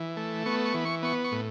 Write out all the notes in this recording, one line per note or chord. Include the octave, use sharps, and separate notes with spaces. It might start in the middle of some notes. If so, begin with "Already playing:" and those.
Already playing: E3
A3
B3 C#6
C#6
E3
C#6
B3 C#6
C#6
A2